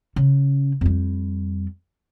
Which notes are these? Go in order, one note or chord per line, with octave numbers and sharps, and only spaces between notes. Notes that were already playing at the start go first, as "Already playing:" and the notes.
C#3
F2 G3